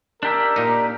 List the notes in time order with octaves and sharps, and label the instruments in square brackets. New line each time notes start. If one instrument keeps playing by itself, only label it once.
[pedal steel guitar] D4 G4 E5 [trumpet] A#4
[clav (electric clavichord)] A#2 D#4